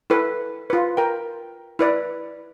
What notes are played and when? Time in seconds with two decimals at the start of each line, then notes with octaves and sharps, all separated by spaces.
0.10 E4 A4 B4
0.70 F4 B4
0.97 A#4 G5
1.79 E4 B4 D5